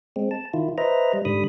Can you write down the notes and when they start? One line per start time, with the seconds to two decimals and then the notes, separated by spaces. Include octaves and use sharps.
0.16 G#3 C4
0.31 A5
0.54 D#3 E4 F4
0.78 B4 C5 D#5 E5 A#5
1.14 G3
1.25 G#2 D3 G3 B5 D#6